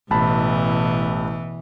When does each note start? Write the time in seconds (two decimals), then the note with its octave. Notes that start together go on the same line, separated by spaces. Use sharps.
0.11 A1 B2 E3 A5 B5